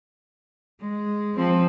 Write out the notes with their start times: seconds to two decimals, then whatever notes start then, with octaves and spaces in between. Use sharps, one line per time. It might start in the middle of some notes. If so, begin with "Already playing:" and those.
0.80 G#3
1.34 F3 C4